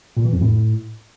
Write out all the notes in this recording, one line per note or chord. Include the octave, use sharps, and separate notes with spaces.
A#2
E3
F2
A2